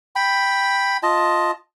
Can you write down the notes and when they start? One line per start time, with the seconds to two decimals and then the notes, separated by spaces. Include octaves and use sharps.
0.16 G5 B5
1.03 F4 D#5 A5